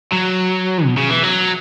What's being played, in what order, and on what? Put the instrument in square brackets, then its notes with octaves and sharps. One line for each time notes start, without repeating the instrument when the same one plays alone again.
[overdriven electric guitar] F#3
B2
C#3
E3
F#3